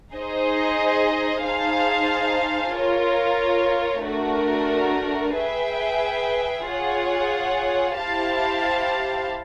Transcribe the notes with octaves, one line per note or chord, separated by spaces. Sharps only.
D#4 G#4 C5 D#5
D#4 G#4 C5 F5 A5
F4 A#4 C#5
A3 D4 F#4 A#4
G#4 B4 E5 G5
F4 G#4 C#5 F#5
E4 G4 C5 F5 A5